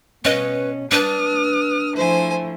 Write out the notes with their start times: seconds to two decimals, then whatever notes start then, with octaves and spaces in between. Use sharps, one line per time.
0.25 B2 C#4 B4 D#5
0.91 D4 B4 D#6 F6
1.96 F3 A3 E4 C5 G#5